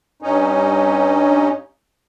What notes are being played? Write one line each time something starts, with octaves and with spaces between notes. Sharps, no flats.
G2 C#4 D#4